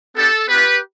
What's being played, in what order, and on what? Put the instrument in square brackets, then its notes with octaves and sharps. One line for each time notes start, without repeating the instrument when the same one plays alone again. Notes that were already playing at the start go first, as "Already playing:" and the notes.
[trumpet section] B3 D4 G4 A4
B3 D4 F4 G4 B4